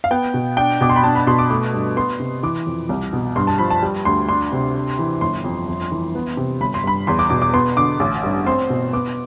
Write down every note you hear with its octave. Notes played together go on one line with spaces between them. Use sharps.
F5
B3 G5
B2
D4 G5
B2 D6
C6
B5
D4 A5
B5
B2 C6
D6
A3 D6
G2
B3 C6
C3
E3 D6
F2
C2
B2
G2 C6
A5
F3 B5
A5
G3
D2 C6
D4 C6
C3
D4
E3
G1 C6
F2
F2
E3
B3
C3
G1 B5
C6
G2 B5
E2 C6
D6
B2 D6
D6
B3 C6
D3 D6
A1 D6
G2
C4 C6
B2
B3 D6